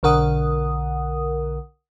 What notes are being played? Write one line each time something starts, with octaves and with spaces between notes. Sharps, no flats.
B1 D3 A#4 F#5 D#6